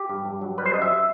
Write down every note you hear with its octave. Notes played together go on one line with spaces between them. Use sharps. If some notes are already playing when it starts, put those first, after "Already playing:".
Already playing: G4
G2
G2
F#3
G3 B4
C5
F#2 D#5
E5